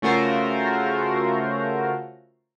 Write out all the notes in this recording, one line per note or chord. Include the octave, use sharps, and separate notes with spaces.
C#3 A3 F4 F#4 A#4 C5